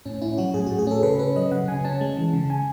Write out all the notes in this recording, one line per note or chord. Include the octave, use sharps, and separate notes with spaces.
A2 C#4
C#4 E4
F#3 F#4
A2 G#4
A2 F#4
G#4
C#4 A4
C#3 B4
C#4 B4
F#3 D#5
C#3 F#5
C#3 G#5
C#4 A5
G#3
E3
C#3
G#5